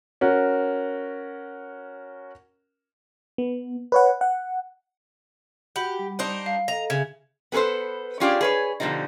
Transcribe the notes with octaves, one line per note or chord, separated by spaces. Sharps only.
C#4 F#4 A#4
B3
B4 C#5 F#5
F#5
F#4 G4 F#5 B5
G3
D4 D#4 C5
F5
A4 D#5 A#5 A#6
C#3 G#4 E5 G#6
B3 G#4 A4 B4 C5
C#4 D4 F4 G4 G#4 D5
G#4 B4 C#5
B2 D3 F3 G3 D#4